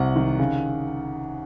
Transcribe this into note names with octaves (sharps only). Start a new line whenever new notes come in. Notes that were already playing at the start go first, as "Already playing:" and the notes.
Already playing: C2 C3 F#5
D#3
C#3